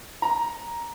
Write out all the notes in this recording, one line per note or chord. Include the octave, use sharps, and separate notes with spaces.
A#5